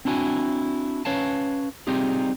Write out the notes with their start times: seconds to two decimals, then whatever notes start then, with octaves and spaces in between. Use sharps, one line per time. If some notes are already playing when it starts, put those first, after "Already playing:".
0.05 C4 D4 E4 F#4 G#5
1.05 C#4 B4 C#5 F5 A5
1.87 G3 C4 D#4 F4 G4 G#4